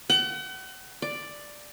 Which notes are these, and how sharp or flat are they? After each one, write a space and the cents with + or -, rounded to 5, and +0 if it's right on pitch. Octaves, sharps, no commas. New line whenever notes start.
F#5 +40
D5 +5